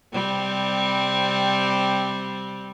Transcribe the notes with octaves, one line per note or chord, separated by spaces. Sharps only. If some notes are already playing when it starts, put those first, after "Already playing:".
C3 G3 C4